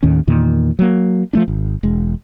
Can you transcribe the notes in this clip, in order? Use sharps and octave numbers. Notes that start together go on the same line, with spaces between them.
D#2 A2 D#3 C#4
E2 A#2 D#3
F#3 A#3
F3 A3 D4
G#1
E1 G#3